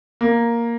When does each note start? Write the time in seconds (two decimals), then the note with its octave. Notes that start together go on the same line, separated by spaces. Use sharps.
0.21 A#3